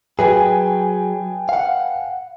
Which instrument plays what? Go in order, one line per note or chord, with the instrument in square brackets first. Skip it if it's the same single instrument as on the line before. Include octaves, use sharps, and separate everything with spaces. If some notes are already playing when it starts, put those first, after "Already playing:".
[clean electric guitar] F#3 G#4 [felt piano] B4 G5 G#5
[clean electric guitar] F5 F#5